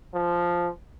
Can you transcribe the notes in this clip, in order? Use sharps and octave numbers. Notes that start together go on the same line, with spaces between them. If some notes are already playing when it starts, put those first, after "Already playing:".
F3